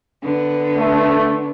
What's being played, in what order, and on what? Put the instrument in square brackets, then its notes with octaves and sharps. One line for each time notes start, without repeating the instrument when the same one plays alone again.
[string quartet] D3 B3
[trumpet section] A3